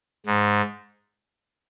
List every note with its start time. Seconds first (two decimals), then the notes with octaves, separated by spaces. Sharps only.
0.26 G#2